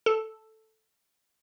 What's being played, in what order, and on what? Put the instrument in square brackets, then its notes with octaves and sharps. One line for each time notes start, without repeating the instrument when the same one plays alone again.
[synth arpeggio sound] A4